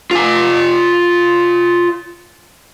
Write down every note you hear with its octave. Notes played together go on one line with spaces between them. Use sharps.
F4 G#5